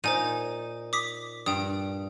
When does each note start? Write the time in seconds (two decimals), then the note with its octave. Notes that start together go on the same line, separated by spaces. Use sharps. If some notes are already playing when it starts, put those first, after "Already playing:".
0.04 A#2 D#4 C5 G#5 D#7
0.93 D6 D#6 B6
1.46 G2 G5 D#6